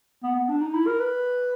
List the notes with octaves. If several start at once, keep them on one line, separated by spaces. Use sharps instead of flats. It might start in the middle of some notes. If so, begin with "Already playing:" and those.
B3
B3
D4
D#4
E4
A#4
B4